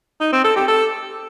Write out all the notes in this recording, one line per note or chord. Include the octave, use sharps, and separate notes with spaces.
D#4
C4
A4
G4
A4